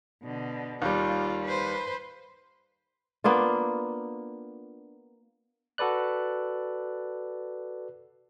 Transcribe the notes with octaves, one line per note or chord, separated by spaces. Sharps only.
B2 D3
D#2 G3 F4
B4 C5
A#3 B3 D4 F4
F#4 A4 B4 D5 F#6